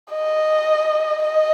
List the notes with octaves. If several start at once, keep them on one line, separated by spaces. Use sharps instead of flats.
D#5
D#5